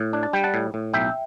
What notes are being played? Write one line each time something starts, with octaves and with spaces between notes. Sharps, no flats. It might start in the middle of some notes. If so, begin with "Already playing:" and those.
Already playing: A2
D4
A5
G3 G5
F#5 A5
A2
A2
B1 E5 G5